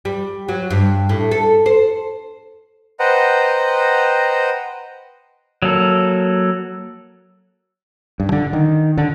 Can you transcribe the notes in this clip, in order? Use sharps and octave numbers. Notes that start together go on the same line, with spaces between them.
G3
F#3
G2
A2
A4
C5
B4 C5 D#5 F#5 G5 A#5
F#3 A#3 A4
G2
D3
D#3
D3